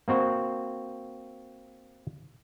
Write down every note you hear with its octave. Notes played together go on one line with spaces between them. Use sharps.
A#3 C4 F#4 C5